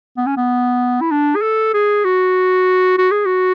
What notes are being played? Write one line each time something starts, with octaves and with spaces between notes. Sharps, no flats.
B3
C#4
B3
E4
D4
G#4
A4
G#4
F#4
F#4
G#4
F#4